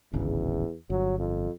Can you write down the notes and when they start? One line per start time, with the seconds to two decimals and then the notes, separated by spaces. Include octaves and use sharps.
0.13 D1 G#1 E2 C#3
0.90 G1 F#3
1.19 F2